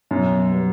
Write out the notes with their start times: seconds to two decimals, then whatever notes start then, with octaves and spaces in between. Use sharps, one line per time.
0.11 F#2 B2
0.50 G3 B3